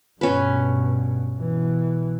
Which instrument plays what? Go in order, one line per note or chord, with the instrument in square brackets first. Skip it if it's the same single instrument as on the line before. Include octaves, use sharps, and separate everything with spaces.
[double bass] G2 B2 [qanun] C#4 B4
[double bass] B2 E3